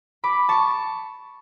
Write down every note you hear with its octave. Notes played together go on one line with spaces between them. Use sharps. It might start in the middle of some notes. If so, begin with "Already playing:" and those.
B5 D6
A5 C#6